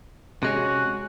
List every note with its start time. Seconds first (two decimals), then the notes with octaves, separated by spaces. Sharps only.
0.43 C3 G#3 C#4 F#4